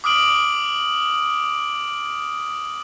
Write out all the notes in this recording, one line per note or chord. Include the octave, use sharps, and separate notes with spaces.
D6 D#6 F6 D7 F#7